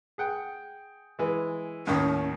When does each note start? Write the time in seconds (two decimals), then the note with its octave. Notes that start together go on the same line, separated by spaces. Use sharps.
0.18 G#4 F#5 G5
1.19 E3 G#3
1.87 D#2 A2 D#3 C#4